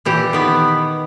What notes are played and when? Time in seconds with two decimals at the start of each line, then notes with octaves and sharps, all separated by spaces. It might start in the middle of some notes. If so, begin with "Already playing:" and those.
0.05 A#2 E3 G4
0.33 D#3 B3 B4